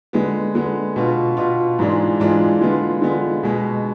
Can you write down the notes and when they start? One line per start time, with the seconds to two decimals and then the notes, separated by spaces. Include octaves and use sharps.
0.13 D3 G#3 B3
0.55 D3 G#3 B3
0.96 B2 B3 F4
1.37 B2 B3 F4
1.79 G#2 E3 G#3 D4 F4
2.20 G#2 E3 G#3 D4 F4
2.61 D3 G#3 B3 F4
3.02 D3 G#3 B3 F4
3.43 B2 G#3 B3